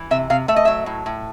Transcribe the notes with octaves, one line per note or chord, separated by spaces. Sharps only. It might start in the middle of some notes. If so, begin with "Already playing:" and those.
Already playing: E3
C3 E5
C3 F5
A3 E5
D#5
F#3 E5
A2
A2